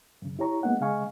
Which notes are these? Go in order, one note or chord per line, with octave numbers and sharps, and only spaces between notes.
F#2 C#3
E4 G4 C#5 A#5 C#6
G#3 A#3 B3 D#4 F#5
C#3 G#3 D#5 F5 G#5 C#6